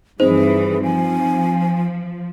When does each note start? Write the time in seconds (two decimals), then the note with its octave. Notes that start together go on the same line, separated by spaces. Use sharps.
0.20 G2 E3 C4 D#4 G#4 C5
0.83 F3 G#5